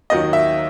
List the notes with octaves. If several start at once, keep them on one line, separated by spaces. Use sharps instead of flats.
D#2 D#3 F#3 D#5
E5